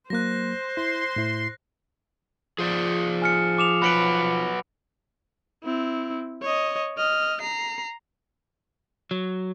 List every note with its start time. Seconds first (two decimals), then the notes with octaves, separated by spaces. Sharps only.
0.10 F#3 A#3 C5 F#6 A#6
0.77 E4 C6
1.16 A2 E4
2.59 F3 G#4 C5 D5
3.22 G#5 F6 C#7
3.58 D6 E7 F7
3.82 F#3 B4 B5 C#7 D7
5.64 C4 E4
6.42 C#5 D#5
6.97 D#5 F6
7.41 A#5 C7
9.11 F#3